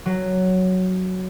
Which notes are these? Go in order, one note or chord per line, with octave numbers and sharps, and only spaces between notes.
F#3